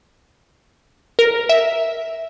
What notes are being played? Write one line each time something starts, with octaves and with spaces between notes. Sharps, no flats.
A#4
E5